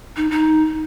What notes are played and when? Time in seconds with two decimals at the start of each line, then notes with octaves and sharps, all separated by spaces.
0.17 D#4
0.31 D#4